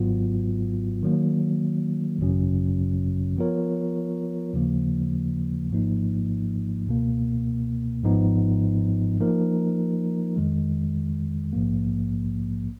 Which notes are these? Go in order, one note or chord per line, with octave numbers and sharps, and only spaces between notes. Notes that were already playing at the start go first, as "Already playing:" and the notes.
Already playing: G#1 G#2 F#3 B3 F4
D#3 F#3 A#3
G#1 F#2 C#3 F#3 C#4
F3 B3 F4 A#4 C#5
D#2 C#3 F3 A#3
G#1 G#2 F3 A#3 D#4
C#2 B2 A#3
G#1 G#2 F3 B3 D#4
F3 A#3 D#4 A#4
F2 D#3 G#3
A#1 G#2 F3 A#3